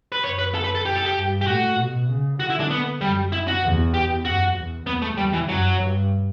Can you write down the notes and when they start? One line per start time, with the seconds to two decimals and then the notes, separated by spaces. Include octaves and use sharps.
0.12 B4
0.23 F#2 C#5
0.39 B4
0.55 A4
0.64 B4
0.75 A4
0.85 G4
0.95 A4
1.05 G4
1.17 G2
1.41 G4
1.47 A2 F#4
1.78 B2
2.09 C#3
2.39 D3 F#4
2.50 E4
2.60 D4
2.70 B3
3.01 F#2 G3
3.32 E4
3.48 F#4
3.63 E2
3.94 G4
4.25 F#2 F#4
4.56 E2
4.86 E2 B3
5.02 A3
5.17 E2 G3
5.33 E3
5.48 F#2 F#3
5.79 G2